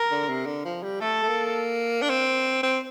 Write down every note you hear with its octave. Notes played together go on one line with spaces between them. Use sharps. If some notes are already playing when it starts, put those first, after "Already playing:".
Already playing: A#4
D3
C3
D3
F3
G3
A3 A4
A3
A#3
D4
C4
C4